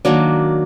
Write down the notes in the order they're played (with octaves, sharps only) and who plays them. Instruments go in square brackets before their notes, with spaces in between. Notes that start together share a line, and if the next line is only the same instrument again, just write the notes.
[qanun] D#3 F#3 A#3 D4